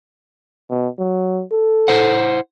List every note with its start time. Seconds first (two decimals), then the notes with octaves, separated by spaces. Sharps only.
0.70 B2
0.99 F#3
1.52 A4
1.88 E4 C5 F#5